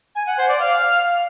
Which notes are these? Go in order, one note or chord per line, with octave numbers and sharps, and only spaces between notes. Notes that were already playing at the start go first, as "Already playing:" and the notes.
G#5
F#5
C5
D5
F5